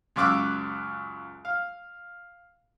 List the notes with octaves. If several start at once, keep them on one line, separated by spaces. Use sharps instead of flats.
C#2 F#2 F5 D6 E6 F#6
F5